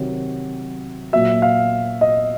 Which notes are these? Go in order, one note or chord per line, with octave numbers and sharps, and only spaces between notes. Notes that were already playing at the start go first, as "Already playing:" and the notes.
Already playing: C3 D#3 F#3
A#2 F#3 E5
F5
D#5